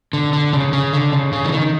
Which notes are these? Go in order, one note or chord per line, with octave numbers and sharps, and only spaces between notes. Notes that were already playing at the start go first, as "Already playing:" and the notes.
D3
D3
C#3
C#3
D3
C#3
C#3
E3
D#3